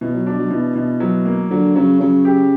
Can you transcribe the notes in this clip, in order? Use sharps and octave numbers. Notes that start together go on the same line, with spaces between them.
B2 E3
F#3
F#3 D4
F#3
B2 E3
B2
F#3
A#3
D3 F#3
C#3 F#3
C#3 F#3
G4